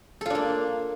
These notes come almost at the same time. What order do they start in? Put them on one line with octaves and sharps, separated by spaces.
A4 F4 D4 A#3